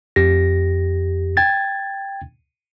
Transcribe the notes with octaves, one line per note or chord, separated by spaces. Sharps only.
F2 G4 A#6
G5 G#6 A6